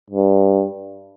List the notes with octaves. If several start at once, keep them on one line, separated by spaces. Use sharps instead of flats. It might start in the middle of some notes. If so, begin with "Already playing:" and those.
G2